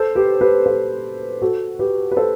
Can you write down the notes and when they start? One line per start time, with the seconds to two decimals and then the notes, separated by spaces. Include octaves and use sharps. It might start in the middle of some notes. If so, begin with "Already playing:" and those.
Already playing: A4 C5
0.15 G4 B4
0.40 G4 B4
0.66 A4 C5
1.42 F#4 A4
1.79 G4 B4
2.11 B4
2.17 A4 C5